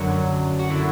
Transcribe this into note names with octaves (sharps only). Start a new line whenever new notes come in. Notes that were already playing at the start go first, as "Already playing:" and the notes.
Already playing: F#2 D3 F#3 F#4
F#4
D3 F#3 E4